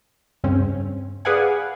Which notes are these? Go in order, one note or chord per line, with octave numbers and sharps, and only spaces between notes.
G2 C#3 C4 C#4
G#4 B4 D5 F5 F#5 G#5